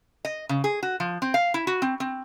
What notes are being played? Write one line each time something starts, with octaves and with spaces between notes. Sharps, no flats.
D#5
C#3
G#4
F#4
F3
C4
F5
E4
F#4
C4
C4